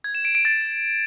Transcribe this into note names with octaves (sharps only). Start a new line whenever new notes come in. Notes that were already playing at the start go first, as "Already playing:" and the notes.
G#6
E7
D7
D7
A6